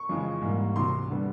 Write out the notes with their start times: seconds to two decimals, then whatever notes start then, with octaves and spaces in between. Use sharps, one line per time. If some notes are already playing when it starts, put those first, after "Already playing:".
Already playing: C#6
0.09 F2 C#3 E3 G#3
0.41 G#2 E3 G3 A#3
0.75 D2 C3 E3 C6
1.10 D3 G3 B3